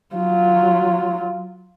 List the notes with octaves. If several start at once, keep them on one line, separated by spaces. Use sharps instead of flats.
F#3 F4